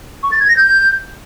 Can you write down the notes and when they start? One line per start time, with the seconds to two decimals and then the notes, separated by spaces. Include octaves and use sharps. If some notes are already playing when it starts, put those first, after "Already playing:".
0.23 C#6
0.32 A6
0.40 G#6
0.48 A#6
0.57 G6